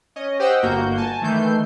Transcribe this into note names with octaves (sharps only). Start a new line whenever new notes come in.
C#4 D#5
G4 C5 D#5 F#5 G5 E6
G1 A#3 F#4 G6
G#5 A5
D#3 E3 A3 G6 C7